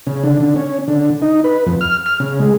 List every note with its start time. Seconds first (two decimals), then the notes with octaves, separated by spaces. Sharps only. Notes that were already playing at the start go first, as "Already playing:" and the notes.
0.07 C#3
0.24 D3
0.40 D3
0.56 C#4
0.88 D3
1.22 D#4
1.44 B4
1.66 F2
1.81 F6
2.06 F6
2.20 C#3
2.40 G#3